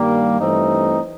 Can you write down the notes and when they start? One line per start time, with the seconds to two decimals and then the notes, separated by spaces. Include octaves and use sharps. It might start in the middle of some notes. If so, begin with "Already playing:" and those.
Already playing: G2 D#3 G3 A#3
0.39 G2 E3 A3 C4 D#4